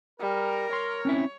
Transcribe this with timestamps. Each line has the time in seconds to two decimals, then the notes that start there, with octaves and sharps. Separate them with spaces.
0.20 G3 A#4
0.73 C#5 C6
1.05 C4 C#4 E4